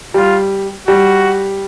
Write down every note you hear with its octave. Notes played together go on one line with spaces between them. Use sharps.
G3 F4
G3 F#4